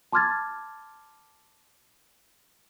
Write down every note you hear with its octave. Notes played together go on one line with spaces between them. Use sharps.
A5 C6 D6 F6 G#6 A6